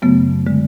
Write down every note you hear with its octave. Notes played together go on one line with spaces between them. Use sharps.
F#2 C#3 F#3 A3 B3
D3 G#3